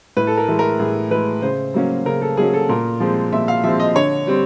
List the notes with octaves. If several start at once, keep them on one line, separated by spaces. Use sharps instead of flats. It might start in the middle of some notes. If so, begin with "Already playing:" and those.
A2 B4
A4
A#4
E3 G#3
A#4
A2 G#4
E3 G#3 B4
C#3 C5
F#3 A#3 C#4
C#3 A#4
A4
F#3 A#3 C#4 G#4
A4
A#2 A#4
F3 G#3 C4
A#2 E5
F5
F3 G#3 C4 E5
D#5
D3 C#5
G3 C4